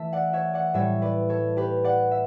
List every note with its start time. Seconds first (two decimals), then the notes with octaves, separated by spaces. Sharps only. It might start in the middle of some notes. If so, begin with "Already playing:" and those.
Already playing: E3 A3 E5 A5
0.13 D5 F#5
0.33 C#5 E5
0.54 D5 F#5
0.74 A2 G3 C#5 E5
1.02 B4 D5
1.29 A4 C#5
1.57 G4 B4
1.84 D5 F#5
2.12 E5